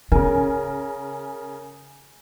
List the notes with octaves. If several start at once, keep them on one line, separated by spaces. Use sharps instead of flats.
C#3 C#4 A#4 G#5